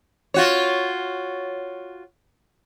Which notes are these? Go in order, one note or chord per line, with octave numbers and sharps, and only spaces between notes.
F4 F#4 C#5